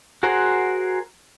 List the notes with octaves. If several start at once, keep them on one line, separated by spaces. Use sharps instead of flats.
F#4 G#4 A#4 C5 F#5